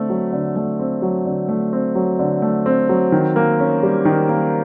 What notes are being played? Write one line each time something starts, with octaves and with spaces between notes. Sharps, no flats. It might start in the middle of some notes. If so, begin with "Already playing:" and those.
Already playing: D3 A3 C4
F#3
D3
A3
C4
F#3
D3
A3
C4
F#3
D3
A3
C4
F#3
D#3
A#3
C#4
G3
D#3
A#3